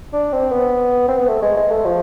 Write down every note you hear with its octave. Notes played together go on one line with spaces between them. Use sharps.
D4
C4
B3
C4
B3
A3
G#3
G#3
A3
F3